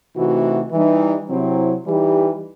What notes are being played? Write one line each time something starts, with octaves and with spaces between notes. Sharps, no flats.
C3 E3 A3 D#4 F#4
E3 G3 D#4
C3 F#3 C4 E4
E3 G3 D#4 G4